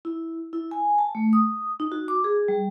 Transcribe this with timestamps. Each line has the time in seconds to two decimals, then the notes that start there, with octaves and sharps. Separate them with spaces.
0.05 E4
0.53 E4
0.71 G#5
0.99 A5
1.15 A3
1.33 D#6
1.80 D#4
1.92 F#4
2.08 D6
2.24 G#4
2.48 G3